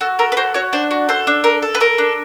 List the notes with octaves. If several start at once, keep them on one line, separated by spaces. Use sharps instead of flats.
F#4 A4
A4 A#4
B4
F#4 C5
F#4 C#5
D4 C5
F#4
A4 C5
D4
A4 A#4
A4
B4
A4 A#4
D4